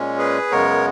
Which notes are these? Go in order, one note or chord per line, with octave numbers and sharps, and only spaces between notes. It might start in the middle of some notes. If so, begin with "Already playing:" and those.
Already playing: A#2 G#3 C#4
G#4 B4
F#2 C#3 G#3 B3 A#4 C#5